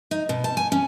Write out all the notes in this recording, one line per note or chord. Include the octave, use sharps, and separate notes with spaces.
D#4
B2
A5
G#5
C#4